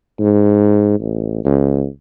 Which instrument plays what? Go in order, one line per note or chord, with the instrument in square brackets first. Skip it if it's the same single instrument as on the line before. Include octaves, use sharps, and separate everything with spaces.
[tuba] G#2
A1
C#2